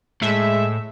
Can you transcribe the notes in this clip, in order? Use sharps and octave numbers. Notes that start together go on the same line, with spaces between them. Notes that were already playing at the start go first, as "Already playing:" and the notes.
A2 G#3 E5